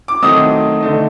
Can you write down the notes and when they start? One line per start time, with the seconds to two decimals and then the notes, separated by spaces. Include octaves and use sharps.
0.08 D6
0.22 D#3 F#3 A3 C4 D#4 D#6
0.80 D3 A3 D#4